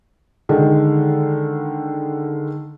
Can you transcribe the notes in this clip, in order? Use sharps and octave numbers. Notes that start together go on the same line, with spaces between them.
D3 D#3 G#3